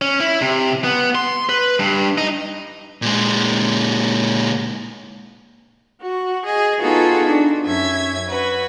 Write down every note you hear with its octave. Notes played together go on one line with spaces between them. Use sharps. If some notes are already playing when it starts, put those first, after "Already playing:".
C#4
E4
C3
B3
C6
B4
G2
D#4
A#2 G#3
F#4
G#4 D#5
B3 D#4 F4 F#4 G#4 A4
D4 D#4 F#4
F#2 C#4 E5 G#6
F#4 B4